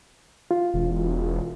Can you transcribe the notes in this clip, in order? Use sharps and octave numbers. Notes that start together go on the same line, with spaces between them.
F4
E1